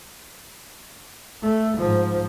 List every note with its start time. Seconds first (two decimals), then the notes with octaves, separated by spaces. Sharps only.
1.42 A3
1.78 G#2 F3